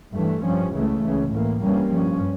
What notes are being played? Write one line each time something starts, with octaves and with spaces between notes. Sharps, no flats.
G2 E3 A3
G2 F3 C#4
C#2 C#3 E3 A3
C#2 C#3 E3
A2 E3 A#3
G2 E3 G3 A#3 C#4
G2 F3 C#4